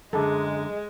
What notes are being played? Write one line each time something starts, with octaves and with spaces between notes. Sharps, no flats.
F#2 D3 G#3 G#4 A4